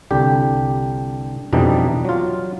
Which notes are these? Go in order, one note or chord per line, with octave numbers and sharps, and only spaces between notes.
C2 D3 G4
F2 B2 E3 G3 D4 D#4
F#3 F4